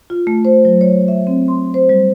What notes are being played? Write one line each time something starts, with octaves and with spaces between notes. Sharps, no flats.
F4
A3
C5
F#3
C#5
E5
C4
C6
C5
G3